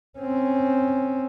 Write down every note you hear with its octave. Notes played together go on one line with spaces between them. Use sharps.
C4 C#4